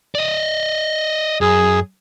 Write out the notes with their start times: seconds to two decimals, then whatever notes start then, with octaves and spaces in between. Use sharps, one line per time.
0.15 D5 D#5
1.41 F#2 G#4